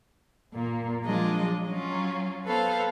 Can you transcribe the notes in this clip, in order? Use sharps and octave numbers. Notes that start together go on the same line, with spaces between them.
A#2 A#3
F3 F#3 G#3 D4 F4 D#5
F#3 C#4 F4
B3 A4 B4 C5 F5